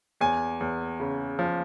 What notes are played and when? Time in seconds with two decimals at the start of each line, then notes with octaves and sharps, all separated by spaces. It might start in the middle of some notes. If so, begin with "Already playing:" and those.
0.21 E2 G#5
0.61 E2
1.00 C#3
1.39 F3